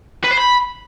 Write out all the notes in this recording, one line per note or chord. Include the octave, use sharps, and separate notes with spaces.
B4
C5
B5